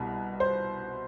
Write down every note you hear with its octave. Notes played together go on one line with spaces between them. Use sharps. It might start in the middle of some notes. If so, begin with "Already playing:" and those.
Already playing: C2 B2 G3
C5